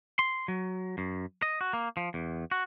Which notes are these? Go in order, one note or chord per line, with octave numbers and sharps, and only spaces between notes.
C6
F#3
F#2
D#5
F#4
A#3
F3
E2
F#4